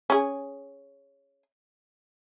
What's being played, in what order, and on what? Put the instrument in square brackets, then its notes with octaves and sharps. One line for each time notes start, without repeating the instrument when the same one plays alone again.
[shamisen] C#4 G#4